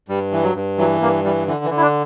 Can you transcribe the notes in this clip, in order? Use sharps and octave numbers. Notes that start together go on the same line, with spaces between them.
G2 G3
E3
F#3
G2
E3 F#3
G2 A#3
E3 G3
D3 E3
E3
D3
E4
D4